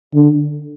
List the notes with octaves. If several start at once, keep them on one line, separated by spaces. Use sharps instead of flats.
D3